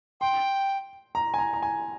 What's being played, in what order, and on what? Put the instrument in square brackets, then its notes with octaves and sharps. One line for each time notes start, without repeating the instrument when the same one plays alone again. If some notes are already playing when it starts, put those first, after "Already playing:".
[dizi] G5 [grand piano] C6
[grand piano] A#5
G#5
A#5
A#5
G#5